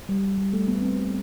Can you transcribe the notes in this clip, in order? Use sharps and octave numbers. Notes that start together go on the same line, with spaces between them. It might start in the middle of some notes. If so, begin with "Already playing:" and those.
G3
G3
A3
B3
C4